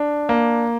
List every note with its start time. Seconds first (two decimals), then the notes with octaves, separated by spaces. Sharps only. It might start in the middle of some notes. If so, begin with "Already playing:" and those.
Already playing: D4
0.29 A#3